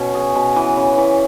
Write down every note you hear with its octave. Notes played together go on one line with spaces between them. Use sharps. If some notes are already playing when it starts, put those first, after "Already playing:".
Already playing: B2 C#4
G#4
B2
E3
C#3
E3